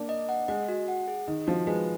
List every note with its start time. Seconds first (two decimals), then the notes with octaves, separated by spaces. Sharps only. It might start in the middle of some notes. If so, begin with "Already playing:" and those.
Already playing: A#3 D4
0.09 D#5
0.29 F#5
0.48 G#3 D#5
0.68 F#4
0.88 F#5
1.08 G#4
1.28 D#3 D#5
1.47 F3 F#4
1.67 G#3 B4